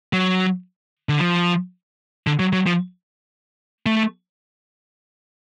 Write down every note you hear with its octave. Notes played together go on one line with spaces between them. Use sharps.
F#3
D3
F3
D3
F#3
F#3
F3
A3